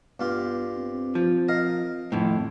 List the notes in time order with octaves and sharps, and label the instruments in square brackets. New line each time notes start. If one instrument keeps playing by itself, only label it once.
[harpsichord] G2 F4 G4 [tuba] B3
[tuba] C4
[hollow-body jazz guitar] F3
[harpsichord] A#4 D#5 F5
[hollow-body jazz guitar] F2 A2 [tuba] D#3